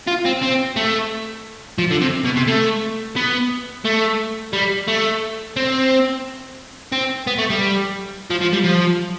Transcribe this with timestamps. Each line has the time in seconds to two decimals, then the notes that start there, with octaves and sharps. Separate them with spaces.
0.07 F4
0.25 C4
0.42 C4
0.76 A3
1.78 F3
1.91 D3
2.01 C3
2.25 B2
2.36 C3
2.48 A3
3.16 B3
3.85 A3
4.53 G3
4.88 A3
5.57 C4
6.92 C4
7.27 B3
7.38 A3
7.50 G3
8.31 F3
8.41 F3
8.53 G3
8.64 F3